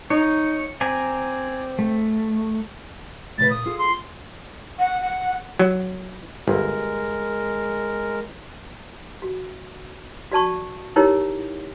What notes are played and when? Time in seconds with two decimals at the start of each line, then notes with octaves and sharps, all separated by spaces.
0.10 D#4 C#5
0.81 C4 D5 G#5 A#5
1.79 A3
3.38 A2 C#3 B4 A6
3.51 A#2 D#6
3.66 F4 G#4 A4
3.78 C6
4.79 F#5
5.01 F#5
5.59 F#3
6.48 G1 G#3 A#4
9.22 F#4
10.32 F#4 D5 A5 C#6
10.96 D#4 E4 G4 A#4 C#5